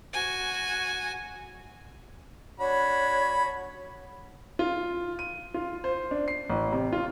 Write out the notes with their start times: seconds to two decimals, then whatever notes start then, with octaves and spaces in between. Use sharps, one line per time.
0.13 F#4 G#5
2.60 D4 F#4 C#5 B5
4.59 F4
5.19 D#7
5.54 F4
5.84 C5
6.11 D4
6.28 C7
6.49 A1
6.72 C3
6.93 F4